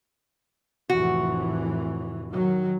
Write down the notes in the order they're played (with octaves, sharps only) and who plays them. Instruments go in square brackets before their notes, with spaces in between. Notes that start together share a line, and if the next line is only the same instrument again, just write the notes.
[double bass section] F1 A2 E3 [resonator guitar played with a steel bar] F#4
[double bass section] D#3 F#3